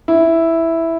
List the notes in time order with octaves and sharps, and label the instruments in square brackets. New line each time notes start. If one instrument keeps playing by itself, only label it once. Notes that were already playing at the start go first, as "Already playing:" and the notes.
[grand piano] E4